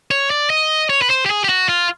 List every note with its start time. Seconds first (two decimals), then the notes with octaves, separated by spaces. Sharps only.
0.11 C#5
0.30 D5
0.50 D#5
0.90 C#5
1.02 B4
1.10 C5
1.26 G4
1.30 G#4
1.44 G4
1.49 F#4
1.69 F4